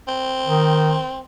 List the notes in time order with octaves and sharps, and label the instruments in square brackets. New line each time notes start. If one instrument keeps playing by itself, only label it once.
[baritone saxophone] C4
[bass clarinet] D#3